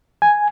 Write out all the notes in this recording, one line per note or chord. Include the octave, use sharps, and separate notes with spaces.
G#5